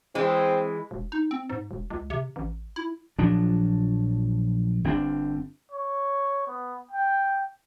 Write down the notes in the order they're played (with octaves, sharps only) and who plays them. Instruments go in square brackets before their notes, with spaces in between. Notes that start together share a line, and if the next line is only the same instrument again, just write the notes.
[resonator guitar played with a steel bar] E3 G#3 [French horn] C4
[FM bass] E1
D#4
C4
G#2
E1
C#2
C3
A1
E4
[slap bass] A#1 F3 F#3 D4
G1 C4 D4
[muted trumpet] C#5
B3
G5